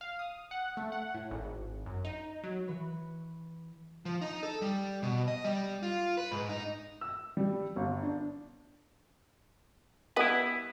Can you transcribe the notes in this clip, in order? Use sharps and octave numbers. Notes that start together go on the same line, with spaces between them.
F5
D#6
F#5
A3
F#5
A2
G#1
F#2
D#4
F#3
E3 B4 B5 C#6
F3
D#4
A4
G3
B2
D#5
G3
F4
B4
G#2
D#4
E6
G3
G1
D4
G3 B3 E4 B4 D#5